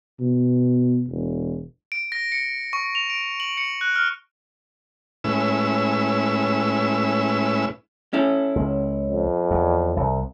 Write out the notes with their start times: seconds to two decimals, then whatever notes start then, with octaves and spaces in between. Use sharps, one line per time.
0.20 B2
1.08 E1
1.92 D7
2.12 A#6
2.32 C#7
2.73 C#6
2.95 F7
3.10 D7
3.40 F#7
3.57 C#7
3.81 F#6
3.96 F6
5.24 A2 G#3 C#4 E4 B4 E6
8.13 C#4 E4 A4
8.56 C#2
9.07 F2
9.51 E2
9.97 C2